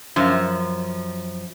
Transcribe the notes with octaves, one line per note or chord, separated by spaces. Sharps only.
F#2 F3